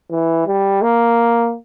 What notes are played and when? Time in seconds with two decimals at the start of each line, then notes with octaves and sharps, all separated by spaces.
0.11 E3
0.47 G3
0.82 A#3